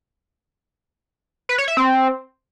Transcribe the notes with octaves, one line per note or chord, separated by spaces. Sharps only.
B4
C#5
E5
C4